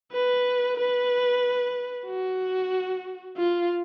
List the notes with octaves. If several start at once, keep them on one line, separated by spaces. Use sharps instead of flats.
B4
B4
F#4
F4